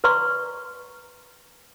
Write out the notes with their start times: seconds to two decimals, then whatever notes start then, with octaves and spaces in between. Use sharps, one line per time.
0.04 B4 D5 A#5 C6 C#6